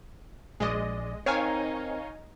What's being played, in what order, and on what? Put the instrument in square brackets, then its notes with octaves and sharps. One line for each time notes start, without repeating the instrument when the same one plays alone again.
[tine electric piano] A#1 D5 [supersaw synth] G#3 D#5
[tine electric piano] C4 A#4 [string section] D#4 [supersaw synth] C#5 F5 G#5